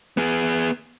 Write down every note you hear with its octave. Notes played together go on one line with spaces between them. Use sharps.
B3 G#4